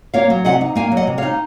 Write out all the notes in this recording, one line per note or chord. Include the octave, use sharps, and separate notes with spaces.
A#3 C#5 F5
F#3
C3 D#5 F#5
D#4
A#3 F5 G#5
F#3
D#5 F#5
C3
C#5 F5
D#4